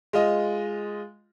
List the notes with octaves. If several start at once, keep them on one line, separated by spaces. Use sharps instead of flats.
G#3 F4 D#5